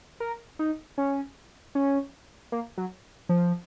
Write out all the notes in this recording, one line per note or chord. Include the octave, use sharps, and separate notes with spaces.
A#4
D#4
C#4
C#4
A#3
F#3
F3